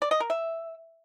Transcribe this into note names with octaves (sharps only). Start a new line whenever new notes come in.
D5
D#5
A#4
E5